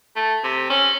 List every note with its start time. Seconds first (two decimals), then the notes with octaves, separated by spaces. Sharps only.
0.16 A3
0.44 C3
0.70 C#4